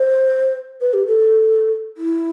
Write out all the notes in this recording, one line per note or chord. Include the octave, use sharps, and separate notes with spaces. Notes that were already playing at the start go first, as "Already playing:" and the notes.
Already playing: C5
B4
G4
A4
E4